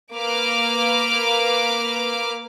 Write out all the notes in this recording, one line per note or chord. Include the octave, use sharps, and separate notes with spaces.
A#3 B4 D6 F6